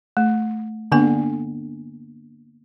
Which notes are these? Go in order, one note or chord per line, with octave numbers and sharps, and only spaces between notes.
A3
D3 A#3 B3 G#5